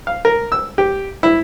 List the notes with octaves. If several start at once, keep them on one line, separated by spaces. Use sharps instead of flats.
F5
A#4
E6
G4
E4